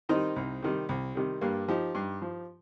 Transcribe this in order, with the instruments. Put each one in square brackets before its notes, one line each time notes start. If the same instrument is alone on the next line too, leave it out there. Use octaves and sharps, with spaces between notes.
[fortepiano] D#3 G3 C4 D#4
C2
C3 D#3 G3
C2
C3 D#3 G3
G2 G3 A#3
F3 D#4 G4
G2
F3